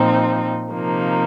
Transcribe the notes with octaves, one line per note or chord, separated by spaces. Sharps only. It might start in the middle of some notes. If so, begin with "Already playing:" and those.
Already playing: A#2 F3 C4 D#4
C3 F3 A#3 D#4